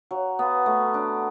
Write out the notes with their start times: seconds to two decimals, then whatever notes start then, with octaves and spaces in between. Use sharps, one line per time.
0.11 F#3
0.39 B3
0.66 A3
0.94 D4